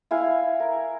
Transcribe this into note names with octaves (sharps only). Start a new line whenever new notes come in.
E4 F5 G#5
A#4